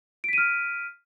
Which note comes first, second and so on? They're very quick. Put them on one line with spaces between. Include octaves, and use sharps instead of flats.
D7 B6 D#7 F6